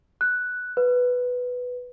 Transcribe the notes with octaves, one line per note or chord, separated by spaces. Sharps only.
F#6
B4